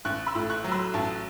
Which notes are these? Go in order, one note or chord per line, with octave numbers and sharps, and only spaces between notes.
A1 C#6 F#6
B5 E6
A2
C#6 F#6
F#3
B5 E6
A1 A5 C#6